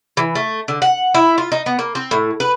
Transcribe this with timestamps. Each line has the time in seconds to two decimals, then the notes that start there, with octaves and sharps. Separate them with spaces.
0.17 E3
0.35 A3
0.68 D3
0.82 F#5
1.14 E4
1.38 F4
1.52 D#4
1.66 B3
1.79 A#3
1.95 C4
2.11 A2
2.40 B4